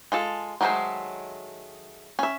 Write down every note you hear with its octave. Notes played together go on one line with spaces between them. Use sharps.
G#3 F4 A4
D#3 F#3 G#3 A3 C5
C#4 E5